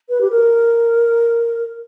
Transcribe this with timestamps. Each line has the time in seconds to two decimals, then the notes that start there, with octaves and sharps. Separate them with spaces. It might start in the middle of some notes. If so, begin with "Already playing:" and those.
0.09 B4
0.21 G4
0.31 A#4